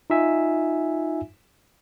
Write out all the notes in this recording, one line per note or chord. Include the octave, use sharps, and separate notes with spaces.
D#4 F4 E5 G#5